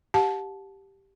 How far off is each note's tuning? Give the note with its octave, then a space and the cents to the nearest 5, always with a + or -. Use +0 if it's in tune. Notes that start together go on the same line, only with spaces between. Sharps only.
G4 +0 F#5 -35 A5 -20